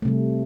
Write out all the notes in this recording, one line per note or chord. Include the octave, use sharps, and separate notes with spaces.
C3 G3 A3